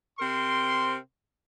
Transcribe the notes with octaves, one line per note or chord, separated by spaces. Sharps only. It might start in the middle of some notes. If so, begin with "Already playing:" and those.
C3 C4 A#4 C6